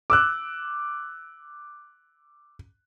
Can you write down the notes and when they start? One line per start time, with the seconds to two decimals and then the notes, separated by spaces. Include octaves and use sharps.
0.10 D6 E6 F#6